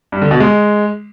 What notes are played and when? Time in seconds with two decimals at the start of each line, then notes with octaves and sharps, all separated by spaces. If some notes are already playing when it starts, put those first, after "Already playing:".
0.12 G2
0.22 D3
0.31 B2
0.40 G#3